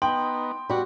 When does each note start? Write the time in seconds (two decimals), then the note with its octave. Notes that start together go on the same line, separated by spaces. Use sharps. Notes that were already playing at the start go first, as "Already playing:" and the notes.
0.02 B3 D#4 G5 C6
0.69 G3 F#4 B4